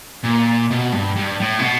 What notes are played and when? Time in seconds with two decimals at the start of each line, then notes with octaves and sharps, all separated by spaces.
0.23 A#2
0.71 B2
0.93 G2
1.16 G2
1.40 A2
1.59 C3
1.62 B2